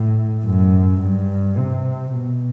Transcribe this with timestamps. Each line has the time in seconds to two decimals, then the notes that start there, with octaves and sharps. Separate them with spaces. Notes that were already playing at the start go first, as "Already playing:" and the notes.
Already playing: A2
0.45 F#2
1.00 G2
1.57 C3
2.12 B2